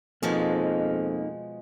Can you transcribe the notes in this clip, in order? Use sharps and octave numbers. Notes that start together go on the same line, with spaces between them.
F2 B2 F3 G#3 A#3 D#4